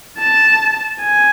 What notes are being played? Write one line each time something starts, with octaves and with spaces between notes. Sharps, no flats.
A5
G#5